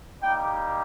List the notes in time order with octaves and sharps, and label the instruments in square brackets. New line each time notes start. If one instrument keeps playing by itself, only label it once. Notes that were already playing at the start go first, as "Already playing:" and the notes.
[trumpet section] G3 A#3 D#4 G4 G5